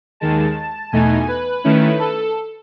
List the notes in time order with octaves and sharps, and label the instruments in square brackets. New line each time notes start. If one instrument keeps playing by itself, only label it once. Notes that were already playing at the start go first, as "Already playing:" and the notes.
[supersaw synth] D#2 D#3 G#3 A5
E2 B2 A3 D#4 G#5
B4
D#3 A3 C#4 E4
A4